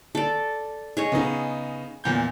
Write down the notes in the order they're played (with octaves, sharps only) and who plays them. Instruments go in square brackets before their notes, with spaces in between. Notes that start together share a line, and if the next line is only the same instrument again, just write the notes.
[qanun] A4 D5
G#4 C#5 D#5
[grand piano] C#3 B3 D#4
E2 A#2 G6